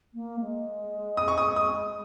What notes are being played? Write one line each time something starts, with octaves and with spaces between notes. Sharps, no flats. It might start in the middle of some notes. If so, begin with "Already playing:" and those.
A#3
G#3
D#6
C#6
D#6
D#6